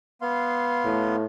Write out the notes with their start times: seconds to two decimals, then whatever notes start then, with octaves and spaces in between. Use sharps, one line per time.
0.22 B3 F5 C6
0.85 A2